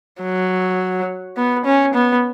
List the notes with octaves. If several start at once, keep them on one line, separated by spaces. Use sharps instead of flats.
F#3
B3
C#4
B3